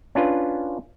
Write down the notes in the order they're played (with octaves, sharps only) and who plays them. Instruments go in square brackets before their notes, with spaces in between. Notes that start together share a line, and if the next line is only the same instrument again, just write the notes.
[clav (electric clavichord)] C#4 D4 F4 B4